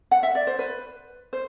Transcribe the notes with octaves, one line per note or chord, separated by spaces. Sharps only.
F#5
E5
D5
C5
B4
C5